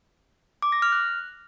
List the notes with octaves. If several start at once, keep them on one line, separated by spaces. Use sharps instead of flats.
D6
A#6
F6
F#6